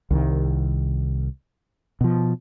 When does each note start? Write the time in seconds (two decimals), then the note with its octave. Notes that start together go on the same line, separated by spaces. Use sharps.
0.11 C2 D#3
2.01 B2 F3